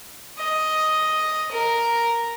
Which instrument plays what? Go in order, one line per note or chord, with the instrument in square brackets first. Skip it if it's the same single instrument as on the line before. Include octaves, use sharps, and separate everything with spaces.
[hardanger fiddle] D#5
A#4